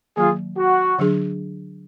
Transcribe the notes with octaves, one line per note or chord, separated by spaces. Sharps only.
D#3 F#3 A#3 F4 G#4
F#4
D3 F#3 D4 G#4